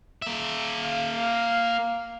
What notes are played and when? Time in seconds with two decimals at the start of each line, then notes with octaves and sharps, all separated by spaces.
0.22 A#3 E5
0.82 F5